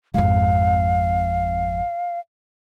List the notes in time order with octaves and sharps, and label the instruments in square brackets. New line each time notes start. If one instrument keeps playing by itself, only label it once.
[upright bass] G#1 F2 [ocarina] F5